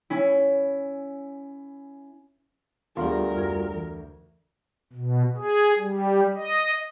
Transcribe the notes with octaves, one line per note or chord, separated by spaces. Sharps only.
C#4 E4
D2 G3 B3 F4 G#4 A#4
F2 F#4 G#6
E3
B2
G#4
G3
D#5